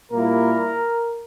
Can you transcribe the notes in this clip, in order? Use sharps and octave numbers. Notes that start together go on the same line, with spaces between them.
A#2 G3 A#3 E4 A#4